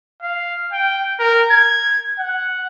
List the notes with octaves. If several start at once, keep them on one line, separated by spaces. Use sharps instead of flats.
F5
G5
A#4
G#6
F#5